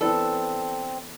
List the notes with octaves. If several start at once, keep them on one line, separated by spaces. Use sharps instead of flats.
E3 B3 C4 D4 A4